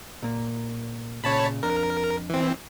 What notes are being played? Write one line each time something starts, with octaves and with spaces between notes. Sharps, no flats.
A#2 A#3
A#2 C#3 C#5 A5 B5
F2 D4 A#4 A#5
E3 C4